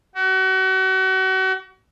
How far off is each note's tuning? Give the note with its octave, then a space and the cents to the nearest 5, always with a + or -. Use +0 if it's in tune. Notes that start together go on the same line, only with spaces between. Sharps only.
F#4 +35